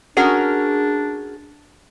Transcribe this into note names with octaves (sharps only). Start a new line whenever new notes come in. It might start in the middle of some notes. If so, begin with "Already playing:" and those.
C#4 D4 F#4 G#4 A#4